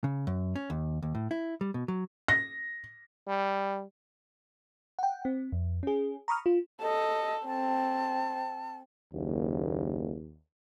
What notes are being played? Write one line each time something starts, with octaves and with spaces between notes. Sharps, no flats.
C#3
F#2
C#4
D#2
D#2
A2
E4
G3
B2
F#3
A#6
G3
F#5 G5
C4
F2
C#4 G#4
A#5 B5 C#6 D#6 F6
F4
A4 D#5
C4 A5
F#1 D#2